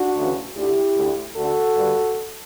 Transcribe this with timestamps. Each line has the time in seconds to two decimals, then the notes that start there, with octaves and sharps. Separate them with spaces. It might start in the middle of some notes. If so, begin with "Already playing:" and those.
Already playing: D4 F#4
0.16 D2 C#3 E3
0.55 D2 D3 E4 G4
0.96 D2 D3
1.36 D2 D3 F#4 A4
1.77 G2 D3